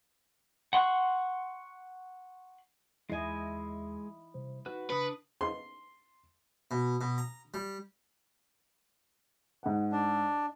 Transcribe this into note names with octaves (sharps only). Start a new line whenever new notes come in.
F#5 C6 C#6 F#6
D#2 G#3 E4 D#5 G#5
C3 G3 C5
D#4 F#4 B4
C#3 D4 B4 D#6 C#7
C6
B2
B2
A#5
G3
G#2 F#5
D4